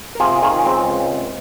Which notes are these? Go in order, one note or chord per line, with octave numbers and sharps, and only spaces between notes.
A#4
C3 F4 G#4
D#3 F4 G#4
C#4
C#2 G#3 C4
C#2
C3